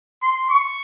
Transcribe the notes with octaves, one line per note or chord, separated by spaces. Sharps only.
C6
C#6